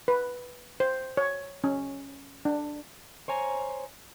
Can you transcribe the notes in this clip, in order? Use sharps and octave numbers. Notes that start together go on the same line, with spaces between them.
B4
C5
C#5
C#4
D4
C5 C#5 G#5 A#5